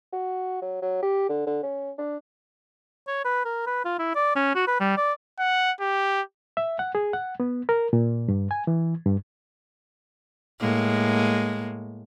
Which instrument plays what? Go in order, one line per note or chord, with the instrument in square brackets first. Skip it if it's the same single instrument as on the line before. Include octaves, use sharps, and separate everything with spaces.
[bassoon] F#4
F#3
F#3
G4
D3
D3
C#4
D4
[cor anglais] C#5
B4
A#4
B4
F4
E4
D5
C#4
F#4
B4
G3
D5
[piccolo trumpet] F#5
G4
[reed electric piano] E5
F#5
G#4
F#5
B3
A#4
A#2
G2
G#5
E3
G2
[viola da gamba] A2 G#3 A#3